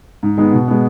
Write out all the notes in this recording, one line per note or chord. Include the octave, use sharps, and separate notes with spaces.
G#2
D#3 G#3 B3
B2
G#3 B3